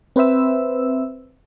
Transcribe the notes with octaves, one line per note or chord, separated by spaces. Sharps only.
C4 B4 C5 E5 E6